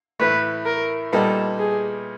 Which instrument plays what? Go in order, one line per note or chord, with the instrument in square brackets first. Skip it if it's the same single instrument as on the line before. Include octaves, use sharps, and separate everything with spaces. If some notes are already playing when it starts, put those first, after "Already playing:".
[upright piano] A2 E3 A3 [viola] B4
[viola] A#4
[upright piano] A#2 G3 B3 D#4 [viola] A4
[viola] G#4